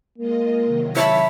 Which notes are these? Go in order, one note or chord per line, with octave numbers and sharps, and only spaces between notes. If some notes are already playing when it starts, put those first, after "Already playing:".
G#3 A#3 F4 D#5
C3 D#3 F#3
C#5 E5 A5 B5